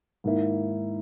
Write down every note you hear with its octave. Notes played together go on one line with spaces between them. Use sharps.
G#2 D#3 A#3 E4